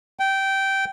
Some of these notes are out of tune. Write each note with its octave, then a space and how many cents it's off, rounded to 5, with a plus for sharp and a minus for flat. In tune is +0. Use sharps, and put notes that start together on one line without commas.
G5 -15